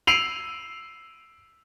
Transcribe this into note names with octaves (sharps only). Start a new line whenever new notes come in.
E6 C7 D7 D#7 F7 F#7